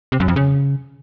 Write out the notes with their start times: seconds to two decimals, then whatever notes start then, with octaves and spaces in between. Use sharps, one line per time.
0.12 C3
0.20 F#2
0.28 F2
0.36 C#3